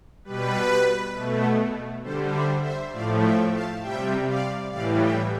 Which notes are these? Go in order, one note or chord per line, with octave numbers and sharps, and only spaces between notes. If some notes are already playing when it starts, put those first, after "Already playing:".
B2 G3 B4
B2 A3
D3 G3 A4 C5
C5 E5
C5 E5
A2 F3 A3 D5 F5
E5 G5
F5 A5
C3 G3 E5 G5
D5 F5
A2 E3 G3 D5 F5
E5 G5